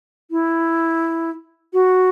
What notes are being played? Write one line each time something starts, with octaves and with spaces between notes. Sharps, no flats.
E4
F#4